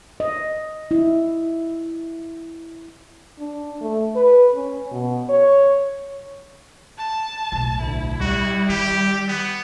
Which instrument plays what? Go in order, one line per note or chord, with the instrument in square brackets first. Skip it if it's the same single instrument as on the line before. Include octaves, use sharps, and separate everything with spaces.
[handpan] D#5
E4
[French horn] D4
A3
B4
C#4
B2
C#5
[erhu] A5
[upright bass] B1 A2
[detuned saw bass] D2 [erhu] E4
[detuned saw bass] G3 [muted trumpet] F#4
[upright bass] D#3 [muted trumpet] G4
[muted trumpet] B3